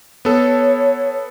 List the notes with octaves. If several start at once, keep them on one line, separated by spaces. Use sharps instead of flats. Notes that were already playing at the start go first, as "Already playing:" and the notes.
B3 A4 C#5